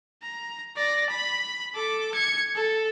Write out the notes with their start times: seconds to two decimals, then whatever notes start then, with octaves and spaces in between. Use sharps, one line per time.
0.23 A#5
0.77 D5 A#6
1.10 B5
1.74 A4 D6
2.14 G#6 C#7
2.56 A4